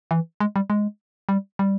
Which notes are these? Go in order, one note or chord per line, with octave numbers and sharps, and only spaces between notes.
E3
G#3
G3
G#3
G3
G3